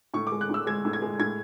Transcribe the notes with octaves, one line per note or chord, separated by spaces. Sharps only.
A2 C#6
D6
G#3
F#6
A2 E6
G#3 G#6
A2
G#6
G#3
A2 G#6